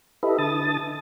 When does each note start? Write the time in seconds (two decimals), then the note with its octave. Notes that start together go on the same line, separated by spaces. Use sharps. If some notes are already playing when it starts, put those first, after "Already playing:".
0.23 E4 G4 A4 B4 D#5 E5
0.39 D3 A5 D#6 A6